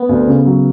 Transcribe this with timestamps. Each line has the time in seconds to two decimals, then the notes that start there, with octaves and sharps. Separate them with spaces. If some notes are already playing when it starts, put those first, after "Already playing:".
Already playing: B3
0.09 D2
0.27 C#3
0.45 F#3